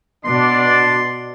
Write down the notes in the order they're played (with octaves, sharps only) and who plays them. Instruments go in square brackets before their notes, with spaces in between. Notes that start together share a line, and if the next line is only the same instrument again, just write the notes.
[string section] B2 [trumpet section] D4 D5 [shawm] C6